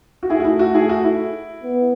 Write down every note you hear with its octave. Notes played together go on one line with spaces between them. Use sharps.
F#4
A3 E4 G#4
F#4
E4
F#4
E4 G#4
F#4
E4
B3